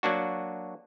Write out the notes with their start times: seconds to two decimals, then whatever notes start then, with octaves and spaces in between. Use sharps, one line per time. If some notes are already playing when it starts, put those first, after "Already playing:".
0.03 F#3 A#3 D4 F#4